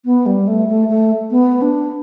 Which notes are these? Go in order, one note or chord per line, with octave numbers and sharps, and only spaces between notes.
B3
G3
A3
A3
A3
B3
D4